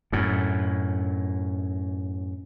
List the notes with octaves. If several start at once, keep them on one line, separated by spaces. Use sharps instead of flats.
F#2 A2